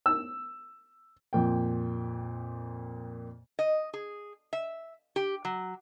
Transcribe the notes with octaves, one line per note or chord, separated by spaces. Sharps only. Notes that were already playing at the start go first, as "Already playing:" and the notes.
E6
F2 A#2 G5
D#5
G#4
E5
G4
F#3